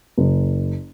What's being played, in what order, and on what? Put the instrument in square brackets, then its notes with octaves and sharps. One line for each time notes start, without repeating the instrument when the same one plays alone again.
[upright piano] F#1